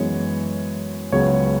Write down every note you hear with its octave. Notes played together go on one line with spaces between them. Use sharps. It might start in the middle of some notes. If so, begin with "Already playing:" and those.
Already playing: F#2 E3 G#3 B3 C#5
C#2 C#3 F#3 B3 C#5